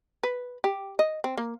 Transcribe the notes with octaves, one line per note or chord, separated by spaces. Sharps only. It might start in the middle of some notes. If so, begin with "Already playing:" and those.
B4
G4
D#5
C4
A#3